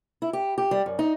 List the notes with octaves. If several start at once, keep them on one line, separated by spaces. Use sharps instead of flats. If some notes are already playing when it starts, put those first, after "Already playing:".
E4
G4
G4
G3
F#2
D#4